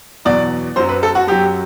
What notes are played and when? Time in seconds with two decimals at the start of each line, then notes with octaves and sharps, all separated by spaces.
0.25 E2 B2 F#3 D5
0.76 F#2 F#3 C5
0.89 B4
1.03 A4
1.15 F#4
1.27 F#2 F#3 G4